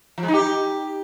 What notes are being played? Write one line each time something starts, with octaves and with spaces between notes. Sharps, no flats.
F3
G#3
D#4
G4